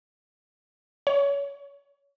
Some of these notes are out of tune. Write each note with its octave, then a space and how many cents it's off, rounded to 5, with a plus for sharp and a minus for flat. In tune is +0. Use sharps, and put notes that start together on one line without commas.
C#5 +30